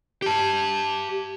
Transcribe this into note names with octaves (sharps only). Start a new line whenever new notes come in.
G4 A5